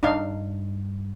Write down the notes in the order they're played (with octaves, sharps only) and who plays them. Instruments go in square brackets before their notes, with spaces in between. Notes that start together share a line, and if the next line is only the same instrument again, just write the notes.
[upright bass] G2 [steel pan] D4 D#4 F5